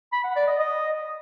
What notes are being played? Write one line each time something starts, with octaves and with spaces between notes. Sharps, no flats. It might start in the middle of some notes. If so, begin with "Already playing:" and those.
B5
F#5
D5
D#5
D#5